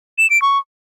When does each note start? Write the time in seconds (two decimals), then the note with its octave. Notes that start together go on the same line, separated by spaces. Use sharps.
0.18 E7
0.30 D7
0.42 C#6